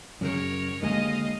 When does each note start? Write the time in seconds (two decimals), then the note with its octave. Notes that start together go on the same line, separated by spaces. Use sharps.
0.21 F#2 C#3 A#4 C#5
0.82 D#2 D3 G#3 D#5 F5 G#5